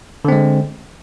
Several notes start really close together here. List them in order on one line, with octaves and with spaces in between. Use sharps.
D3 C4 G#3